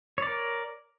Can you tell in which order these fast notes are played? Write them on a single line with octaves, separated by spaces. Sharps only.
C#5 D5 A#4